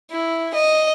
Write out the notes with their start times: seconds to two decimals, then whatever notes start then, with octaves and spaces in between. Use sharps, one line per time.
0.11 E4
0.54 D#5